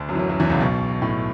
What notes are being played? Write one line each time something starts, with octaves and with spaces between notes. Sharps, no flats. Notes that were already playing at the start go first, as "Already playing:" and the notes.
Already playing: D2 D3
F#2 F#3
E3
F#2 F#3
F#2 F#3
E2 E3
C#2 C#3
B1 B2
A2